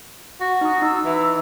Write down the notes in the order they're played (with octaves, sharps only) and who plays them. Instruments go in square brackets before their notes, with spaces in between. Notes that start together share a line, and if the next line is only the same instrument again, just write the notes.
[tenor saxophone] F#4
[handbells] D#4 D#6
[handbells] D#4 [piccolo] E6
[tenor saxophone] E3